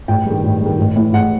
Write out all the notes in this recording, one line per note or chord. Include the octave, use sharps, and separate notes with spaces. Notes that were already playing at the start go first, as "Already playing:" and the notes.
A1 G5
G2 D#3
A1
G2 D#3
A1
A2 E3
A1 F#5